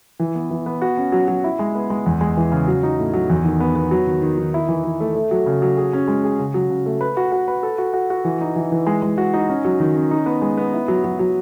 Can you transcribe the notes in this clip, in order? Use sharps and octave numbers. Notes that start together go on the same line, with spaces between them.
E3
B3
E3
B3
F#4
C#4
F#3
F#3
E4
G#3
B3
G#3
E2
G#3
E3
C#3
F#3
D#4
A2
F#3
E2
D#3
B3
B3
F#3
D#3
D#3
D#3
E4
E3
E3
A3
A3
F#3
C#3
F#3
G#4
C#4
G#3
G#4
C#3
F#3
C#3
A3
B4
F#4
F#4
B4
A4
F#4
F#4
F#4
E3
D#4
E3
E3
G#3
G#3
F#4
D#4
C#4
F#3
D#3
C#4
D#4
B3
G#3
B3
E4
F#3
F#3
F#3